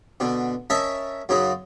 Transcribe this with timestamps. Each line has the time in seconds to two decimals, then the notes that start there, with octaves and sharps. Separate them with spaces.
0.20 B2 D3
0.70 C#4 A#4 D#5 E5 A5
1.29 F#2 C#3 F#3 D#4